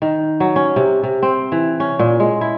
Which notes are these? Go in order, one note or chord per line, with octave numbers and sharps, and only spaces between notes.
D#3
F#3
C#4
C3
C3
C4
E3
C#4
A#2
G#3
E4